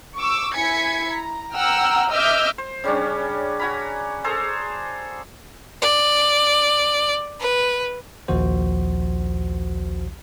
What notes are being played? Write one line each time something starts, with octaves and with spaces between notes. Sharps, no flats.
C#6 D6 E6
E4 G#5 G#6 B6 C#7
A#5
F#5 G5 A#5 E6 F6
D#5 E5 D6 E6 F6 G6
C5
C#3 G3 C#4 D4
F#4 G#5 A#5 B5
G#4 A4 C5 A#5
D5
B4
A#1 D#2 F3 F#4 C5